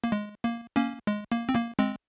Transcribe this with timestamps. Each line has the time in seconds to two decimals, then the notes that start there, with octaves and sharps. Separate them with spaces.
0.04 A#3
0.12 G#3
0.44 A#3
0.76 A#3 C#4
1.07 G#3
1.32 A#3
1.49 C4
1.55 A#3
1.79 G#3 C4